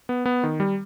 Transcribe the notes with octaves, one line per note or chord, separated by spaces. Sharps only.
B3
B3
D#3
G3